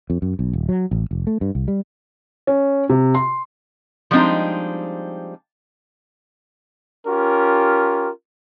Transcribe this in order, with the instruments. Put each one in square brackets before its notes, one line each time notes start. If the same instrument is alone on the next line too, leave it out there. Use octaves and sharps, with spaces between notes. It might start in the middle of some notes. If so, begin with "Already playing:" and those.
[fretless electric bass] F2
F#2
B1
D#1
F#3
A1
F1
A3
G2
C2
G3
[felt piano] C#4
C3
C6
[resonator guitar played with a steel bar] F3 G3 G#3 C4 D4 D#4
[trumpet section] C#4 F4 G4 A#4